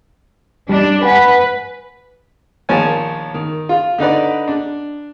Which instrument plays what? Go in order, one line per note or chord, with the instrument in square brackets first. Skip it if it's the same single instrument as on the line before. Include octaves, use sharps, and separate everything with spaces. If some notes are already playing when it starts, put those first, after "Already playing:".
[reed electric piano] G3 [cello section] D4
[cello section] B4 [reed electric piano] F#5 G#5
[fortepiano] A#1 D#3 F3 C#5 G#5
D#3
F4
D3 D#4 B4 D5
D4